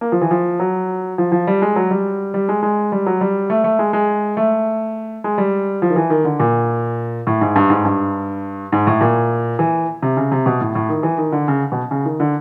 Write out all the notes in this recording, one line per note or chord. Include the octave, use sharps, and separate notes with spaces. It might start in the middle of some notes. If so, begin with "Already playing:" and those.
A#3
F3
E3
F3
F#3
F3
F3
G3
G#3
F#3
G3
G3
G#3
G#3
G3
F#3
G3
A3
A3
G#3
G#3
A3
G#3
G3
F3
D#3
E3
D#3
D3
A#2
A2
G#2
G2
G#2
G2
G#2
A2
A#2
E3
C3
C#3
C3
B2
A2
A2
D#3
E3
D#3
D3
C#3
B2
C#3
D#3
D3